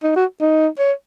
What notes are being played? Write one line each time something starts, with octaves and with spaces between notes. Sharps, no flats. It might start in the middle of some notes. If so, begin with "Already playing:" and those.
D#4
F#4
D#4
C#5